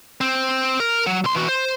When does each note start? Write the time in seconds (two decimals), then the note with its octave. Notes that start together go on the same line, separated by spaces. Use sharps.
0.21 C4
0.80 A#4
1.07 F#3
1.24 C2 C6
1.36 E3 F#4
1.49 C5